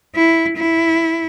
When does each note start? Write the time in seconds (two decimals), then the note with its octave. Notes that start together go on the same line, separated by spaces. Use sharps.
0.15 E4
0.57 E4